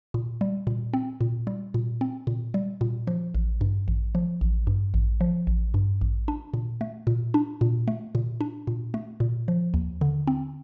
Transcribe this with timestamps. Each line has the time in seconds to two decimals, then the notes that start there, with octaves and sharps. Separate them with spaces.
0.14 A#2
0.41 G3
0.67 A#2
0.94 C4
1.21 A#2
1.47 G3
1.74 A#2
2.01 C4
2.27 A#2
2.54 G3
2.81 A#2
3.07 F3
3.34 A1
3.61 G2
3.88 A1
4.15 F3
4.41 A1
4.67 G2
4.94 A1
5.21 F3
5.47 A1
5.74 G2
6.01 A1
6.28 D4
6.54 A#2
6.81 A3
7.07 A#2
7.34 D4
7.61 A#2
7.88 A3
8.15 A#2
8.41 D4
8.67 A#2
8.94 A3
9.20 A#2
9.48 F3
9.74 D#2
10.01 D3
10.27 C4